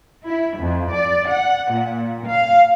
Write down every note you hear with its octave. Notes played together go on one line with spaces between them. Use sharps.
E4
F2
D5
F#5
A#2
F5